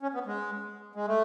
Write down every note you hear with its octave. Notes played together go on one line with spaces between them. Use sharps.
C#4
B3
G#3
G#3
A3